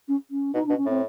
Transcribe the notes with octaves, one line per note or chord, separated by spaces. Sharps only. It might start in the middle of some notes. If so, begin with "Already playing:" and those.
C#4
C#4
B2 D#4
B2 D4
C#4
A2 C4